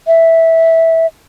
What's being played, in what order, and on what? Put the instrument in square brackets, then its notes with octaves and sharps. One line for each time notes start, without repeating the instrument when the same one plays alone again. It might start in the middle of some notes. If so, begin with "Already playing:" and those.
[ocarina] E5